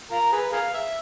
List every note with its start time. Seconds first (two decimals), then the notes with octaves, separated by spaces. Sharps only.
0.11 F4 A#4
0.32 G#4 B4
0.52 G#4 A#4 F5
0.74 E5